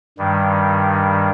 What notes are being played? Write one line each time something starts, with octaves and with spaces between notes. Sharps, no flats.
G2 D#3 G3